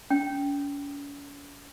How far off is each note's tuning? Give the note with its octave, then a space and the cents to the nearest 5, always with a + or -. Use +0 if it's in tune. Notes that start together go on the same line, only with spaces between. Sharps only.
C#4 +45 G5 +0